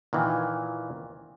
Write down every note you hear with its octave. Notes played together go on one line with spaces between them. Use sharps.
A#2 D#3 E3